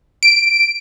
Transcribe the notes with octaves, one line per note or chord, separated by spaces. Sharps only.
D7